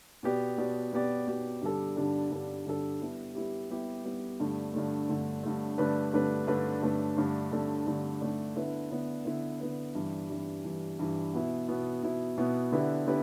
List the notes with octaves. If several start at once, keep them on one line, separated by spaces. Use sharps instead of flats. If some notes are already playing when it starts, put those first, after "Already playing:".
B2 B3 G4 D5
B2 B3 G4 D5
B2 B3 G4 D5
B2 B3 G4 D5
G2 D3 G3 D4 A4
G2 D3 G3 D4 A4
G2 D3 G3 D4 A4
G2 D3 G3 D4 A4
G3 B3 E4 G4
G3 B3 E4 G4
G3 B3 E4 G4
G3 B3 E4 G4
G2 D3 A3
G2 D3 A3
G2 D3 A3
G2 D3 A3
G2 D3 A3 D4 B4
G2 D3 A3 D4 B4
G2 D3 A3 D4 B4
G2 D3 A3 D4 B4
G2 D3 A3 D4
G2 D3 A3 D4
G2 D3 A3 D4
G2 D3 A3 D4
D3 B3 E4 B4
D3 B3 E4 B4
D3 B3 E4 B4
D3 B3 E4 B4
G2 E3 G3
G2 E3 G3
G2 E3 G3
G2 E3 G3
B2 B3 E4
B2 B3 E4
B2 B3 E4
B2 B3 E4
D3 B3 E4 G4 B4
D3 B3 E4 G4 B4